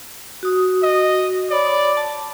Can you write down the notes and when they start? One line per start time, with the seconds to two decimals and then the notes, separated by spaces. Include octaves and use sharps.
0.43 F#4 D#6
0.83 D#5
1.50 C#5 D5 B5
1.97 A5